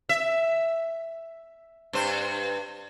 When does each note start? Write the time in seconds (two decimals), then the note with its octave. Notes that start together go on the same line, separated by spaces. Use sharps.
0.09 E5
1.93 G2 C5